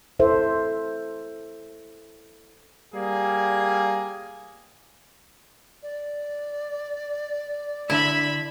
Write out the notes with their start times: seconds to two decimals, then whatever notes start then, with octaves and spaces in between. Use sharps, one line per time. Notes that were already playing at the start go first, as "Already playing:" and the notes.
0.20 E4 A4 C5 E5
2.95 G3 A#3 G#4
5.82 D5
7.90 D3 E4 E5 B5